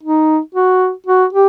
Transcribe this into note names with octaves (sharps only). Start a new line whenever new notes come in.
D#4
F#4
F#4
G4